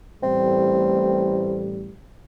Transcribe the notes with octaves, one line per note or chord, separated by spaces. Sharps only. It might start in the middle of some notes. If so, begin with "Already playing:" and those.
A1 A2 G3 C4